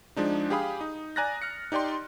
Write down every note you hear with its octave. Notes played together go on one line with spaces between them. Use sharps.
F3 G#3 D4 D#4
G4 G#4 F5 B5 D#6
D#4
D5 G#5 A#5 F#6 A6 A#6
F6 A#6 C#7
D#4 G4 D5 G5 C6